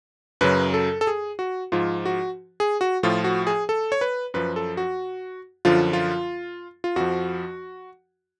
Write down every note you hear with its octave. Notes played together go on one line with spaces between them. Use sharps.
F#2 C#3 F#3 B4
A4
A4
G#4
F#4
G#2 F3 F4
F#4
G#4
F#4
A2 F3 F4
F#4
G#4
A4
C#5
B4
F#2 F3 B4
A4
F#4
F#2 D3 F3 F4
F4
F4
F2 F3 F#4